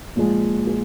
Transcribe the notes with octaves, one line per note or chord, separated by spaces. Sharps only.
A#2 F3 G#3
G#4